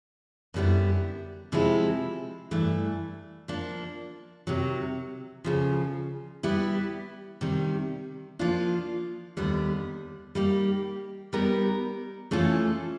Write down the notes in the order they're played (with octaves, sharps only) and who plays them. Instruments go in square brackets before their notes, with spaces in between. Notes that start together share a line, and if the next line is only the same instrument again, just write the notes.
[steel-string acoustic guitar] F#2 D3 G3 B3 E4
C3 F3 G#3 C4 E4
G2 E3 A3
F3 A#3 D4
C3 D#3 F#3
D2 C#3 F3
G3 B3 E4 G4
C3 D#3 G3
F3 A#3 D4 F4
D#2 D3 G3 B3
G3 A#3 D#4 G4
G3 B3 D#4 G4 A#4
E3 A3 C#4 F4 A4